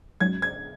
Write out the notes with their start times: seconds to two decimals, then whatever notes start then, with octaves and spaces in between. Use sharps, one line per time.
0.20 G#2 F#3 C#4 F#4 G#6
0.42 G#6